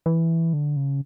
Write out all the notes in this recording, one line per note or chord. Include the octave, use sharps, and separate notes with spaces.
E3
D3
C#3